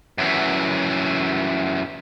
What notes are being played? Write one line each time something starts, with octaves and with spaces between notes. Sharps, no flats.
F#2 E3